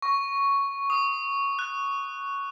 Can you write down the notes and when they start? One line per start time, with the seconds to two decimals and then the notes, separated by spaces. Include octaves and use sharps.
0.02 C#6
0.90 D#6
1.59 F#6